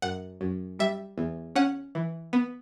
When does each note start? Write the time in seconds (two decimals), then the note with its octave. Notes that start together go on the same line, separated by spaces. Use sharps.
0.02 F#2 F#5
0.41 F#2
0.79 G3 E5
1.18 E2
1.56 C#4 F#5
1.95 E3
2.33 B3